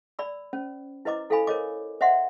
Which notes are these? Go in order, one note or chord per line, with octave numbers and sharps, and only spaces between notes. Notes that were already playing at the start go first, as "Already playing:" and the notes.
D5 B5 E6
C#4 C5
E4 B4 C5 D#5 A#5 D6
E4 A4 C5 F5 G#5 B5
A#4 C5 C#5 D#5 D6
C5 D#5 E5 F#5 C6